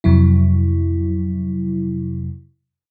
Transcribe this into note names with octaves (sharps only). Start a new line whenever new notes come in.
F2 C3 F#3 E4